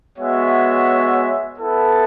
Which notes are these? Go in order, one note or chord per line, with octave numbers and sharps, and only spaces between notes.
G#3 B3 F#4 C#5 E5
B3 E4 A4